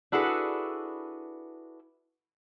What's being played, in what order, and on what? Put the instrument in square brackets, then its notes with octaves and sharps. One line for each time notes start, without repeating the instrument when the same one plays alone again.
[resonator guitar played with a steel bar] D4 E4 F#4 G#4 A4 B4